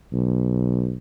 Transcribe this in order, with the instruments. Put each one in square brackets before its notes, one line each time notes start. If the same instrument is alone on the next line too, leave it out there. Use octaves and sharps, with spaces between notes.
[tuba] B1